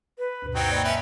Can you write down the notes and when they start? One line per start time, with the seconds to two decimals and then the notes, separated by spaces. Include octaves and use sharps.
0.19 B4
0.42 D2 G2 B2
0.55 F#3 C4 D#4 G5
0.69 A#3 D5 B5
0.84 C#4 B4 E5